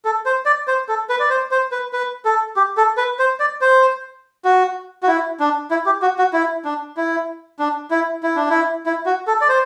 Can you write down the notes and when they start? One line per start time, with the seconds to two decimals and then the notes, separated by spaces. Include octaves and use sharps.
0.05 A4
0.26 C5
0.46 D5
0.68 C5
0.88 A4
1.09 B4
1.19 D5
1.30 C5
1.51 C5
1.72 B4
1.93 B4
2.25 A4
2.56 G4
2.77 A4
2.97 B4
3.19 C5
3.40 D5
3.61 C5
4.44 F#4
5.03 F#4
5.08 E4
5.40 D4
5.71 E4
5.86 G4
6.02 F#4
6.18 F#4
6.33 E4
6.65 D4
6.97 E4
7.59 D4
7.91 E4
8.23 E4
8.36 D4
8.50 E4
8.86 E4
9.06 F#4
9.27 A4
9.41 D5
9.49 C5